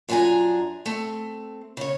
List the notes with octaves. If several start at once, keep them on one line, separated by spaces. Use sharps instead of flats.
F#2 F3 D4 F#4 G#5 A#5
A3 C4
C#3 C#5